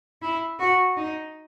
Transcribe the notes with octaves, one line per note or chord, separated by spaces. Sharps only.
E4
F#4
D#4